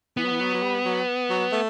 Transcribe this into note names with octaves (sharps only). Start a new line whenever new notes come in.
E3 B3
F#3
E3
F#3
F#3
G3
F#3
F#3
A3